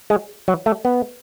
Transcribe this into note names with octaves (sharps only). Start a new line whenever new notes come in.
G#3
F#3
A3
B3